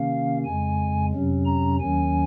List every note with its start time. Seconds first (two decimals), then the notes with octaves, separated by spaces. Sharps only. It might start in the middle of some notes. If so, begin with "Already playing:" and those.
Already playing: C3 D#3 A#3 C#4 F5
0.45 F2 C#3 G#3 G#5
1.12 F2 C3 F#3 C#4
1.46 A#5
1.80 D#2 D#3 F#3 C#4 G#5